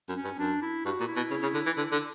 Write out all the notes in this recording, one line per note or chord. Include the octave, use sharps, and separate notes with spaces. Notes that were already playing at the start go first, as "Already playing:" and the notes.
F#2
C#4
G2
F#2 D4
E4
G2 F#4
A#2
E4
B2
C#3
C#3
D3
E3
D3
D3